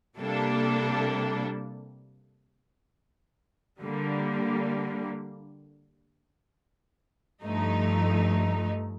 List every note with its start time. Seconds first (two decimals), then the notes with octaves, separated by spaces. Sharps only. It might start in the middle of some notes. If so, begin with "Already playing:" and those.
0.17 C3 G3 A#3 D4 A4
3.81 D3 G3 A#3
7.43 G2 F3 A3 D#4